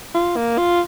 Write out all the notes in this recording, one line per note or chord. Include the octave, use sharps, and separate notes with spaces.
F4
A#3
F4